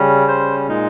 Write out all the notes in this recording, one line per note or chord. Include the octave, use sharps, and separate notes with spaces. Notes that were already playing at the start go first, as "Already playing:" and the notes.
Already playing: C#3 G3 C#4
C5
A#2 G#3 D#4